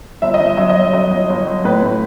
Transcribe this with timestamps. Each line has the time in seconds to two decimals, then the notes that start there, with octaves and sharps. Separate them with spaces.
0.22 G1 E5
0.34 D#5
0.40 G1
0.46 E5
0.57 F#3 E5
0.69 D#5
0.75 G1
0.82 E5
0.93 F#3 D#5
1.10 G1
1.30 G1
1.47 F#3
1.65 A2 B4
1.82 A2